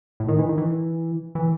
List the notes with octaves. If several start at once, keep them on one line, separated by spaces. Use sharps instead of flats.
A2
D#3
E3
D#3
E3
E3